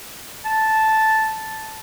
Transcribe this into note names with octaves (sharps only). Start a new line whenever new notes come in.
A5